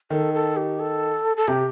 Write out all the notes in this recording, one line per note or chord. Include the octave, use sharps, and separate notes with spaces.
D#3 A4
A4
G4
A4
A4
C3 G4